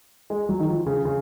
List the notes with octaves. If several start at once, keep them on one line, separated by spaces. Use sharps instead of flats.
G#3
F#3
D#3
F3
C#3
C#3